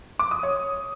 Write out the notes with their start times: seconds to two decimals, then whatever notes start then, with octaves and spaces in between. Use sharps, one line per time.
0.19 D6
0.31 D#6
0.43 C#5